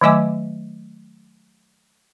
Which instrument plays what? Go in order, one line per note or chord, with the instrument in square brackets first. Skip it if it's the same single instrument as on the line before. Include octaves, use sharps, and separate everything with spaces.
[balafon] D#3 F#3 A3 D#5 G#5 D6